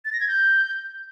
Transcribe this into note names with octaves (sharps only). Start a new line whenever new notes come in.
A6
A#6
G#6
G6